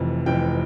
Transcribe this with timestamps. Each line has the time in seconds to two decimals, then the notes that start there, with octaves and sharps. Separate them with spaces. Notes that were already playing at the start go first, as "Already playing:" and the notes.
Already playing: F1 F2 E3
0.26 F1 F2 E3 G5